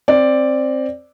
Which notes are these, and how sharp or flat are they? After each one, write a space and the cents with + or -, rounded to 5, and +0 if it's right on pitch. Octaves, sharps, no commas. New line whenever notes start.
C4 +15 D5 +0